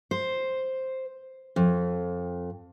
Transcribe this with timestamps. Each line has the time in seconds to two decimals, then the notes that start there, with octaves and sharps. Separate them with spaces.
0.11 C5
1.56 F2